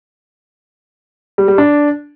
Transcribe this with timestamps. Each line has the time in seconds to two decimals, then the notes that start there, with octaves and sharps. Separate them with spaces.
1.38 G3
1.48 G3
1.58 D4